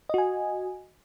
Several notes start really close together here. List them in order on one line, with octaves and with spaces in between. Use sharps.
D#5 F#4 G#5